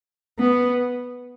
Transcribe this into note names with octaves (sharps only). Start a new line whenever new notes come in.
B3